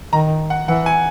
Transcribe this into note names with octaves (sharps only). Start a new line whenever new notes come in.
D#3 A#5
F#5
E3 F#5
G#5